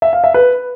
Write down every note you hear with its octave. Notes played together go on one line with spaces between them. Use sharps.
E5
F5
E5
B4